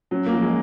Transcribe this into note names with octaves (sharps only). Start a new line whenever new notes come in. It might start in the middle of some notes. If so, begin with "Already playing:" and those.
F#3 C#4
A#3
F3
G#3